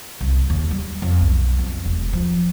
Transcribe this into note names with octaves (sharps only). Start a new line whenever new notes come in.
C2
D#2
G3
F2
B1
F2
E1
F3